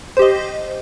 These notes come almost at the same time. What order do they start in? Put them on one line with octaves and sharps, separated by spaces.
C5 G4 D#5